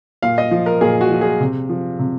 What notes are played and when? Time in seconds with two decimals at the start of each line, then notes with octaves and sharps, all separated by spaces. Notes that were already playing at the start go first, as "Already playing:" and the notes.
0.22 A#2 F5
0.38 D#5
0.51 F3
0.66 A#4
0.81 A#2 G#4
1.01 F#4
1.11 F3
1.21 G#4
1.41 C3
1.69 F3
1.99 C3